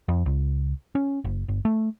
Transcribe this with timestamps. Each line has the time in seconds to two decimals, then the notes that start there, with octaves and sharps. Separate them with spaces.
0.08 F2
0.26 C#2
0.95 C#4
1.24 F#1
1.48 G1
1.65 A3